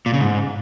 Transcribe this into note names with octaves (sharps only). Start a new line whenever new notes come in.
A#2
C#3
G#2